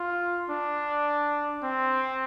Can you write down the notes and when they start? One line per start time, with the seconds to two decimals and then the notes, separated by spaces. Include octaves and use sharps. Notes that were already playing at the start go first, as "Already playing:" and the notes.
Already playing: F4
0.50 D4
1.63 C4